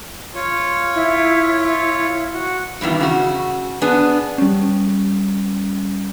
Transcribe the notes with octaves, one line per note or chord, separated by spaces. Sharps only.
F4 C#5
E4
F#4
G2 B2 D#3 E3
C#3 F#4
B3 D4 G#4
G3 C#4